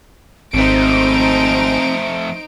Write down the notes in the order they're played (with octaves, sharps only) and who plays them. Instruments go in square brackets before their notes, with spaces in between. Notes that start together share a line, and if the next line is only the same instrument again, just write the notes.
[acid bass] G#1 [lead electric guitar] F2 A3 [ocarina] C4 [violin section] D#4 C5 D7